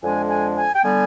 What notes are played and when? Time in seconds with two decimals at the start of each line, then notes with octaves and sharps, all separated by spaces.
0.03 F2 D3 G#3 D4 G#5
0.30 G#5
0.56 G#5
0.75 G5
0.83 D3 G3 B3 G#5